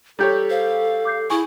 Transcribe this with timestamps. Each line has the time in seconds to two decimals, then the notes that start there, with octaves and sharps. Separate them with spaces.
0.19 G3 G4 A4 C#5 A#5 G6
0.50 C5 F5
1.05 D6 G6 C7
1.30 E4 G#4 G#5 C#6